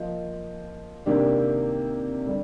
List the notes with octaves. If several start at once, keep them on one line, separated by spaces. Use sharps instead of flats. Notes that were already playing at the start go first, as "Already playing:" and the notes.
Already playing: F3 A#3 F4 C5 D#5
C3 D#3 A#3 D4 G4
D3 G3 D4